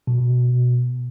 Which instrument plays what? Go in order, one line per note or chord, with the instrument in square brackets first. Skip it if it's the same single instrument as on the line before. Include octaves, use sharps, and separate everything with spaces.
[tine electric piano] B2